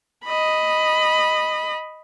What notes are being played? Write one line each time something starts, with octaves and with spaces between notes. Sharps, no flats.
D#5 B5